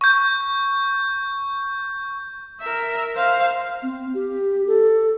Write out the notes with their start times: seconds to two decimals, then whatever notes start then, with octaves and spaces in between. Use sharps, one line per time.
0.01 C#6 G6
2.60 A#4 E5
3.15 C5 F5
3.83 C4
4.14 G4
4.67 A4